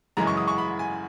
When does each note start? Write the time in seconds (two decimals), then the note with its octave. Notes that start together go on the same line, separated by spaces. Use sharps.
0.17 F#2 C#3 E3 G#3 A#5
0.27 C#6
0.37 D#6
0.48 C#6
0.58 B5
0.79 G#5